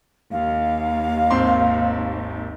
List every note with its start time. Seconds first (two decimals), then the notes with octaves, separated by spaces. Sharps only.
0.32 D#2 F5
1.31 G#1 C4 C6